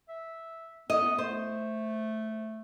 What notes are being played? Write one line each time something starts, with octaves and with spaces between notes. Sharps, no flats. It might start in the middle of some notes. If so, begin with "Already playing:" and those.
E5
B3 D#5
A3 C5